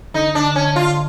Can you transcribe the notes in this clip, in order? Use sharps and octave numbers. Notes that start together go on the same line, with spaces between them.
D3 D#4
D4
C#4
F4